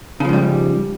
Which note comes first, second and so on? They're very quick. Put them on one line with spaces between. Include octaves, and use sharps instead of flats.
C#3 F3 G#2 G3